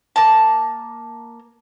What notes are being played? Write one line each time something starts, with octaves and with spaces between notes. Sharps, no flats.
A#3 A5